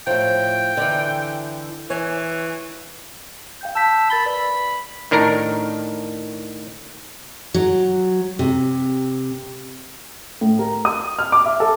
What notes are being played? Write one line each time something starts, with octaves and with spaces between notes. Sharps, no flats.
A2 F3 G5
D3 E3
E3 C#5 G#5
F5 G5 G6
A5 E6 G6 B6
A#4 B5 A6 G7
B4 D5 B5
A2 D#3 D4 A#4 A#5
F#3
C3
A2
A#4
D#6
F6
D6
E5
A4